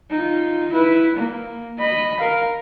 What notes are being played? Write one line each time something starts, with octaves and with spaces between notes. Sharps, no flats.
D#4 F4
E4 B4
A#3
D#5 B5
A#4 F5